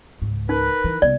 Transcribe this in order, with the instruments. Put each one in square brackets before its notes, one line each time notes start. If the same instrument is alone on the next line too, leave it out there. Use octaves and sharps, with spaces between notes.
[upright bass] C#2 G#2
[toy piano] D#4 [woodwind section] A#4 B4
[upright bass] E3
[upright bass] C2 B3 [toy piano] D5